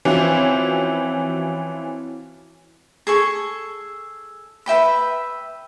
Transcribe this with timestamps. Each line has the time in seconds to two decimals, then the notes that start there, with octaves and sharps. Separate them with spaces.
0.05 E3 F3 C4 C#4 E4 F#4
3.07 G#4 A4 C#6
4.66 B4 E5 G5 B5